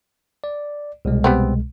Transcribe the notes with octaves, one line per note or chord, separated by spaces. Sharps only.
D5
C2 B2 G#3
G3 B3 C4